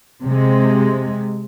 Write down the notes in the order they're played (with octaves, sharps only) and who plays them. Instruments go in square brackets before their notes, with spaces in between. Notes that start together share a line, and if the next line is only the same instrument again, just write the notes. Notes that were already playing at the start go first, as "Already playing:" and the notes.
[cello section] C3 G#3